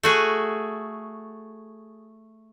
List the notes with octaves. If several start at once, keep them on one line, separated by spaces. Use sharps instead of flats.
A3 F#4 G#4